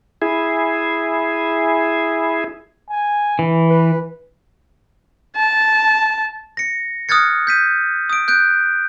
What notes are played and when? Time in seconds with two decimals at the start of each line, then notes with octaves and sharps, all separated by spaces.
0.22 E4 G#4
2.90 G#5
3.39 E3
3.69 B4
5.36 A5
6.57 A#6 C#7
7.09 D#6 F6 F#6 G#6 A6 C#7
7.47 G6 B6 D#7
8.10 D#6 D7
8.28 F#6 G6 D7